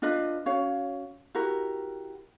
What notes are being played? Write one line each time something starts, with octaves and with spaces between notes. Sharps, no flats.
D4 F4 B4 D#5
C#4 F#4 C#5 F5
E4 F#4 G4 A#4